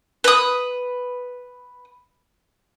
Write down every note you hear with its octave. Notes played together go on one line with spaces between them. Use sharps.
B4 D#6